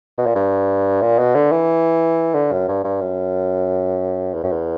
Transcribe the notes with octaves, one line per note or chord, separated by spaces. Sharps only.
B2
A#2
G2
A#2
B2
D3
E3
D3
F#2
G2
G2
F#2
E2
F#2
E2